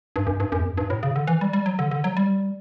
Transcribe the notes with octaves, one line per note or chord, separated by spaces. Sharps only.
G2
F#2
G2
F#2
E2
F#2
G2
A2
C#3
D3
E3
G3
G3
F#3
D3
D3
F#3
G3